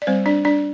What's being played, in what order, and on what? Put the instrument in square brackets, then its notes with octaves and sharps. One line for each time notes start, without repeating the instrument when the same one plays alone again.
[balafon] D5
G3 C4 C5
D4 D5
D4 D5